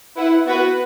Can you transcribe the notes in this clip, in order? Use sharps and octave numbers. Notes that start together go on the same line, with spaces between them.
E4 B4 F#5
B3 F#4 B4